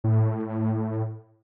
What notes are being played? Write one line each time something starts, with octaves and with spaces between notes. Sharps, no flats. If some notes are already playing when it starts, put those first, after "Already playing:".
A2